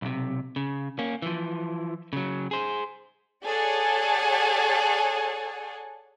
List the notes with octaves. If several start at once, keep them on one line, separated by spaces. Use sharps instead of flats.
B1 C3
C#3
A#3 C#4
E3 F3
C#3 F#3
G#4 C5
G#4 A4 C#5 D5 F#5 G#5